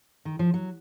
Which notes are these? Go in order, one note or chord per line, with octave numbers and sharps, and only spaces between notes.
D#3
F3
F#3